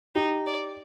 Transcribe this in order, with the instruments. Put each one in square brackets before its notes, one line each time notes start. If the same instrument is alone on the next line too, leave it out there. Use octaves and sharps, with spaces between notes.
[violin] D#4 [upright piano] G4
[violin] D5